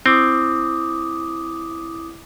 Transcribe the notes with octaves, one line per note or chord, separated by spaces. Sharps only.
C4 E4 D6 D#6